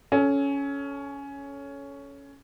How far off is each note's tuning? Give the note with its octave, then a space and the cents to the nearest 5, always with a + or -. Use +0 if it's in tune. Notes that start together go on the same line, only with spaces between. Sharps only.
C#4 +10 A4 -25